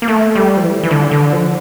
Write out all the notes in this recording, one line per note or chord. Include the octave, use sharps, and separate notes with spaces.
A#3
A3
G3
F3
E3
E3
D3
D3
F3